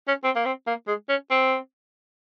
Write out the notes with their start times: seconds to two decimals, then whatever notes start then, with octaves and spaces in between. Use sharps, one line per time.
0.08 C#4
0.24 C4
0.36 A#3
0.45 C4
0.67 A#3
0.87 G#3
1.09 C#4
1.31 C4